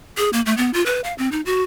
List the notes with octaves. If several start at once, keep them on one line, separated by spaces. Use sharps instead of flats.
G#4
A#3
A3
B3
F4
B4
F5
C4
D#4
F#4